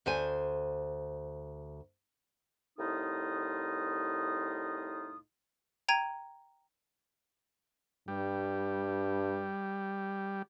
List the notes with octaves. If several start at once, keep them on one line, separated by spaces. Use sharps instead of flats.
D2 C5 G#5
C2 A2 D#4 F4 D#5 D#6
G5 A#5 G#6 D#7
G2 G3